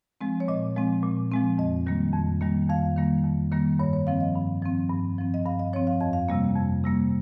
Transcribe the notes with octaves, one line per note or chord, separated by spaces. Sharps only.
F3 G#3 C4
C#5
A#2 D#5
F3 G#3 C4
A#2
F3 G#3 C4
F2 D#5
D#3 G3 A#3
F2
D#3 G3 A#3
F2 F5
D#3 G3 A#3
F2
D#3 G3 A#3
G2 C#5
C#5
F3 C4 F5
D#5
G2
F3 C4
G2
F3 C4
D#5
G2 F5
D#5
F3 C4 C#5
F5
F2 D#5
F5
C3 G3 A#3
F2
C3 G3 A#3